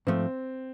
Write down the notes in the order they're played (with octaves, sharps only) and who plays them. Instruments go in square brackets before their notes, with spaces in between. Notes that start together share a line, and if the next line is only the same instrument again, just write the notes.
[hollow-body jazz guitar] G#2 F3 A3 [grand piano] C4